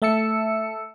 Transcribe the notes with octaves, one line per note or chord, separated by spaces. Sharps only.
A3 E5 A5 E6 C#7